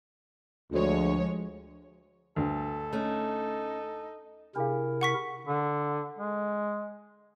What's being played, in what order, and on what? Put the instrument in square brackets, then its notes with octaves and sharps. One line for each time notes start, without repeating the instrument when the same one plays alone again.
[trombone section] D2 [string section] F3 G#3 C#5
[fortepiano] D2 G2 [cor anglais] A4
[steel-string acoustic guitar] A3 C#4 [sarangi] D#4
[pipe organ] C3 E4 A#4 [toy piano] D4 G#4 F5
[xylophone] F#5 C#6 B6
[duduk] D3
G#3